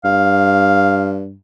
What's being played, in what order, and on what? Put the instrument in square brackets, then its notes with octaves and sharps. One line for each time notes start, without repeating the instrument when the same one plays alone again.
[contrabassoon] G2 [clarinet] F5